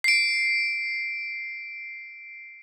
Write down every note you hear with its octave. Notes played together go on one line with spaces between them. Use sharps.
C7 D7